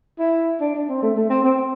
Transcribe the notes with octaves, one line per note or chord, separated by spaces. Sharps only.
E4
D4
D4
C4
A3
A3
C4
C4